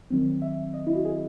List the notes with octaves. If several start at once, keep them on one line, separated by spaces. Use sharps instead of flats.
D#3 F#3 C4
E5
D#5
E4
F#4
G#4